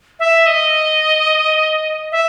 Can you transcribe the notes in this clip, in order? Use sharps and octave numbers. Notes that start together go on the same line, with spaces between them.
E5
D#5
E5